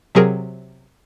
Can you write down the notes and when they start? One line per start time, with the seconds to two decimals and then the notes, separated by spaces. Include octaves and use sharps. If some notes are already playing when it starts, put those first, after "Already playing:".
0.15 C3 F#3 G#4 A#4